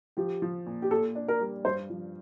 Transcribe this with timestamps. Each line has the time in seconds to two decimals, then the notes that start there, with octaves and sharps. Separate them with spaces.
0.17 F3 G4
0.42 F3
0.66 A#2
0.82 G4
0.91 A#2 A4
1.15 D4
1.28 A#4
1.40 G3
1.65 G2 C5
1.90 F3